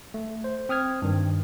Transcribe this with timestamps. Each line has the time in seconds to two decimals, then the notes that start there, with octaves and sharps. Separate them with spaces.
0.14 A3
0.44 C5
0.69 C4 D#6 F6 G#6
1.02 G2 D#3